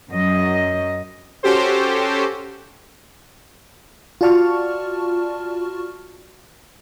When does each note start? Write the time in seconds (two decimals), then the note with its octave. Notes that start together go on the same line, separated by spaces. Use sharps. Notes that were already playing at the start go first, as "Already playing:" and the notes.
0.10 F#2 F#3 D#5
1.43 C#4 F#4 G4 A4 C5
4.21 F4 F#4 D5 A5 C#6 F6